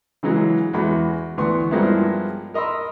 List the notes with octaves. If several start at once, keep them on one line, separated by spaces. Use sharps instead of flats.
C#3 E3 F#3 G#3
E2 G#3 F#4 B5
D2 E3 B3 C6 C#6
G2 F3 G#3 A#3 B3 E4
A#4 D#5 B5 C6 E6